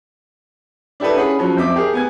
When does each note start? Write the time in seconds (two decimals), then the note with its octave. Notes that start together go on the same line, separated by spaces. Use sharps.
1.00 D4 E4 G4 A4 B4
1.16 C#4 G#4 F#5 B5
1.39 F3 F#3 C#4
1.57 F2 C4 E5 D6
1.76 G4 G#4 A#4
1.93 B3 G#5 G#6